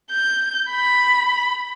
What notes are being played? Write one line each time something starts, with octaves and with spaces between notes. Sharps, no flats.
G6
B5